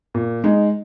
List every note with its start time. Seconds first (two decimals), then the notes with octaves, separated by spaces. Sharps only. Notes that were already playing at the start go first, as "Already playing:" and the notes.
0.14 A#2
0.44 G#3 D#4